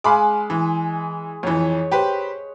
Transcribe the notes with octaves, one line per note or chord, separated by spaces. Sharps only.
G#3 F5 B5 D6
E3
F2 E3 C#5
G4 B4 C5